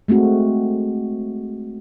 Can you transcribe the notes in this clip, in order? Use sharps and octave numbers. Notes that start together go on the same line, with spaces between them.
G#3 A3 C4 F#4